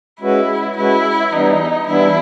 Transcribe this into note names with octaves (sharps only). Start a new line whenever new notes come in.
G#3 C#4 E4 F#4 B4
G#3 C#4 E4 F#4 B4
E3 G3 B3 D4 D#4
E3 G3 B3 D4 E4